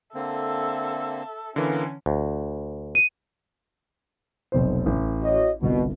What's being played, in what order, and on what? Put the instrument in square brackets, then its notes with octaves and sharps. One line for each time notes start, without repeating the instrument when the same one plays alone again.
[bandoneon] D3 A#3 C4 [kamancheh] A4 E5
[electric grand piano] D3 E3 [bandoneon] A#3 B3 A#4 [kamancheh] C#4
[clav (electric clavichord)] D2
[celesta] D#7
[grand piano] F1 B1 C5
A1
[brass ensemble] F#4 C#5 D#5
[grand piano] G1 C2 [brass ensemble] B2